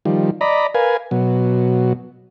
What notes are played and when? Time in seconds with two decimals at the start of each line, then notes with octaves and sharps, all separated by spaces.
0.05 D#3 F3 G3
0.41 D5 D#5 A#5 B5
0.75 A#4 B4 F5 G#5
1.11 B2 F#3